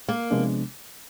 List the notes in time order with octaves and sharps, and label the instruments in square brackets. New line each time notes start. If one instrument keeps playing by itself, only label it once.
[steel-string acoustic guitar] A#3
[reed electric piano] C3 F3 G#3 B3 D4